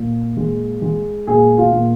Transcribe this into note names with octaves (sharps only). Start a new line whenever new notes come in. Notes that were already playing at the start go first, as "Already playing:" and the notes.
Already playing: A#2
G#3
G#3
A#2 G#4
F4
A#2